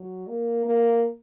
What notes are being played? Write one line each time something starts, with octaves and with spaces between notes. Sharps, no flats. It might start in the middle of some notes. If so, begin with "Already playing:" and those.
Already playing: F#3
A#3
A#3